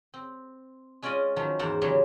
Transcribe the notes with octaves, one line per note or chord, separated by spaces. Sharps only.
C4
G#3 C#4 F4 D5 D#5 G#5
D#3 F3 F#3 C#4
E2 G#2 A#4 C5 F#5 A5
C#3 E3 F#3 G3 G4 C5